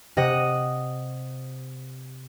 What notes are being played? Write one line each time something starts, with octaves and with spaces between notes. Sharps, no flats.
C3 D#5 F#5 D#6